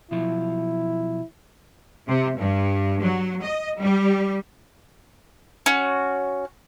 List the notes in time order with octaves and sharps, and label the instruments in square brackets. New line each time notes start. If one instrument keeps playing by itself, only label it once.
[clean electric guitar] B2 F3 F#3 [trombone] E4
[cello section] C3
G2
F#3
D#5
G3
[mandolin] C#4 F#4